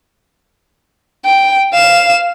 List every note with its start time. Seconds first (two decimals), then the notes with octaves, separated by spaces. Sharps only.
1.25 G5
1.73 F5 E7